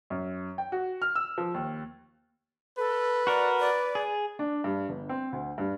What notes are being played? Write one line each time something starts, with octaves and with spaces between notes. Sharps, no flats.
F#2
G5
F#4
F6
E6
F3
D#2
A4 B4
F#4 A#4 D5
D5
G#4
D4
G2
G1
C4
D2
G2